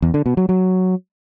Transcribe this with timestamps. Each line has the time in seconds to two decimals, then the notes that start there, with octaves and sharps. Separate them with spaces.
0.02 E2
0.14 D3
0.26 B2
0.37 F#3
0.49 F#3